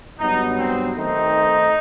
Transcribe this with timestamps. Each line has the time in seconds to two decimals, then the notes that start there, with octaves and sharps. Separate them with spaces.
0.19 G2 F#3 B3 D#4
0.58 C4
0.96 D#3 A3 C4 D#4